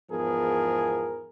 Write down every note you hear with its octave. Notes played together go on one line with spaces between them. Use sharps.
E2 G#2 F3 B3 G#4 A#4